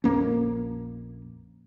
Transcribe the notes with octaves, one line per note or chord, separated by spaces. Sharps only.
A#1 F2 A#3 C#4